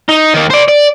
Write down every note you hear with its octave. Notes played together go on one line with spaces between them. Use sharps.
D#4
D#3 A#3
C5 D5
D5